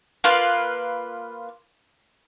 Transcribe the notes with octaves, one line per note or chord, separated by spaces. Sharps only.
A#3 F4 B4